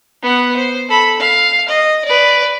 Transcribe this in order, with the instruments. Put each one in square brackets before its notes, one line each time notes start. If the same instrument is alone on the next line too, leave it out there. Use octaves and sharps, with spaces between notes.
[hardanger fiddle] B3 F#5
C5
A4 B5
F5
D#5
B4 D5